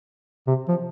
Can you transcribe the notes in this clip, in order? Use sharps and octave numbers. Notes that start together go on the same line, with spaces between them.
C3
F3